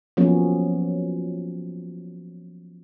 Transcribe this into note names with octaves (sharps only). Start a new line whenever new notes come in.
F3 F#3 A#3 B3 C#4